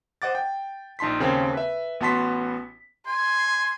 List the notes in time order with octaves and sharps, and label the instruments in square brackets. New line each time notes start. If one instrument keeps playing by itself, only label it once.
[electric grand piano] C5 D#5 F#5 D6 A6
G5
A#1 D#4 A5 C6 B6
D#2 C#3 A#3 C4 G5
B4 E5
A1 B3 F#4 A5 C6 B6
[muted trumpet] G#5 [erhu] C6